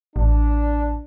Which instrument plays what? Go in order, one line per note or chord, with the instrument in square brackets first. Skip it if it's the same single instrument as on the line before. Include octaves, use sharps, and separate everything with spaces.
[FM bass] A1 [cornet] D4